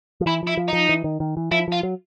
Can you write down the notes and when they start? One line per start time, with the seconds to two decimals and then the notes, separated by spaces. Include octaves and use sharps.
0.21 F3
0.26 E3 E4
0.43 F3 E4
0.57 F3
0.68 F3 D#4
0.89 E3
1.04 D#3
1.20 D#3
1.37 E3
1.52 F3 E4
1.68 F3 F4
1.83 F#3